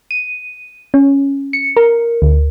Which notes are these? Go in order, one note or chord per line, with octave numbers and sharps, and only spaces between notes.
D#7
C#4
C#7
A#4
D2